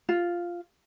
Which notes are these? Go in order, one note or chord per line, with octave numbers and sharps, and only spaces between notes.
F4